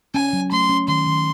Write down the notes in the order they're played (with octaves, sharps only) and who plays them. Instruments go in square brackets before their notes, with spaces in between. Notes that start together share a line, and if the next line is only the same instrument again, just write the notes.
[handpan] C#4 [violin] G#5
[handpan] F#3
[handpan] A3 [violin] C6
[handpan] C#4
[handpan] D#3 [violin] C6
[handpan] D#3